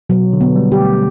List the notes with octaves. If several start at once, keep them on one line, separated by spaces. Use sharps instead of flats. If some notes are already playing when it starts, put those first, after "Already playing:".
B2 F#3
D3
B3
G3
G4
A3